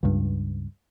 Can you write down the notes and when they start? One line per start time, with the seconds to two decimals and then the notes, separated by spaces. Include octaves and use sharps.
0.03 C#2 G2